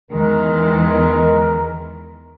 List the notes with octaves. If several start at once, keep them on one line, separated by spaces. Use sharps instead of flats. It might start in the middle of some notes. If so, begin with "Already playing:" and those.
E2 D#3 E3 G#3 A#4